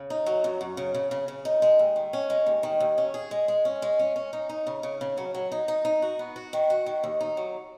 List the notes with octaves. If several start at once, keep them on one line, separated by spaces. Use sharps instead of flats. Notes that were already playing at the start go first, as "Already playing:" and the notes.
Already playing: C#3
D#4
F#3
F#2
F#2
C#3
C#3
C#3
C#3
D#4
G#3
D#2
D#3
C#4
G#3
D#2
D#3
D#2
C#4
G#4
G#3
G#3
C#4
G#3
C#4
C#4
D#4
D#4
C#3
C#3
C#3
F#3
F#3
D#4
D#4
D#4
F#4
B3
F#4
D#3
F#4
D#3
D#2
D#4
F#3